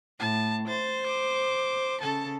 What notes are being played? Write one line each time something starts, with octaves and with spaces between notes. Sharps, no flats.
A2 A5
C5 A6
D6
C#3 A4 A5